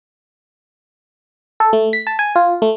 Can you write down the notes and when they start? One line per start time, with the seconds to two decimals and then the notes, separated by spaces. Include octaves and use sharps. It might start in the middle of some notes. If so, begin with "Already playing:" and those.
1.60 A4
1.73 A3
1.93 B6
2.07 A5
2.19 G#5
2.36 F4
2.62 A3